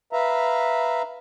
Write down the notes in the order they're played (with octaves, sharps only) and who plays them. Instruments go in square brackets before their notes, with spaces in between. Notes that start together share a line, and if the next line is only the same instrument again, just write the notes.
[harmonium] B4 E5 F5 A#5